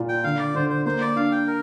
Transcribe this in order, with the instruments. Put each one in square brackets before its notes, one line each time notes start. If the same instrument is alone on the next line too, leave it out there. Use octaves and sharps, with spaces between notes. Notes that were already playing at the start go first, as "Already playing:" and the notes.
Already playing: [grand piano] A#2 F4
[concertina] G5
[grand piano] D3 [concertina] F5
[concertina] D5
[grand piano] D3 [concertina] C5
[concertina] C5
[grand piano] A#3 [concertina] C5
[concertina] D5
[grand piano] D4 [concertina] F5
[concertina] G5
A#4